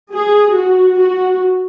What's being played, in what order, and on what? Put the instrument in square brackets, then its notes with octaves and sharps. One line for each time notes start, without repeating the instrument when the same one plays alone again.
[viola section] G#4
F#4
F#4